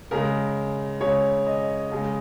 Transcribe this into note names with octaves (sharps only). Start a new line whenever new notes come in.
C#3 G#3 A#4
C#3 G#3 C#5
D#5
C#3 G#3